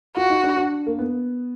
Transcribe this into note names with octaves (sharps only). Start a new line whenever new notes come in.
F4 F#4
D#4
D4
D4
A#3
B3